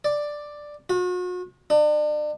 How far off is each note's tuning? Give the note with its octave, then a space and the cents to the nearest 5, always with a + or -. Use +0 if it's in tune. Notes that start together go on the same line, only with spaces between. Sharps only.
D5 +5
F#4 -40
D4 +40